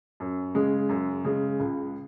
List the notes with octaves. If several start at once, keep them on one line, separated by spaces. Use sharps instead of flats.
F#2
C#3 G#3
F#2
C#3 G#3
C#2